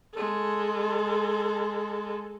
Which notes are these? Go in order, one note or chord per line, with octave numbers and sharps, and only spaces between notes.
G#3 A4